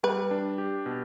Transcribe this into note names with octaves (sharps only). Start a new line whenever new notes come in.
G3 B4
D4
G4
B2